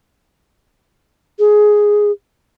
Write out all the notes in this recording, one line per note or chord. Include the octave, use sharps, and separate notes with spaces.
G#4